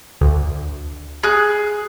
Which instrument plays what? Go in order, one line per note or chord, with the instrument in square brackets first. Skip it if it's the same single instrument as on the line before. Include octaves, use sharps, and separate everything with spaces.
[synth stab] D2
[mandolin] G#4 F#6